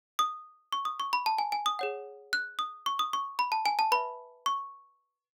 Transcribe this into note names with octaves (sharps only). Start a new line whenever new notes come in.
D#6
C#6
D#6
C#6
B5
A5
G#5
G#5
D#6
G#4 C#5 F#5
F#6
D#6
C#6
D#6
C#6
B5
A5
G#5
A5
B4 E5 B5
C#6